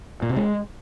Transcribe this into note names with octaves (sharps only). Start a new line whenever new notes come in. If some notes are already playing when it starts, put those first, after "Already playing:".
A#2
C3
G#3